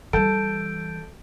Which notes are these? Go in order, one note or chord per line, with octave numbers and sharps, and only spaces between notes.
E3 G3 A4 G6 D7